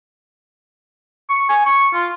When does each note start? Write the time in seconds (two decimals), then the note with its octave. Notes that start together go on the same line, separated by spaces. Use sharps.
1.29 C#6
1.49 G#5
1.66 C#6
1.93 F4